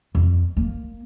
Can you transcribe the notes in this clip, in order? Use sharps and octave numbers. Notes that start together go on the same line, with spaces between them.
F2
A#3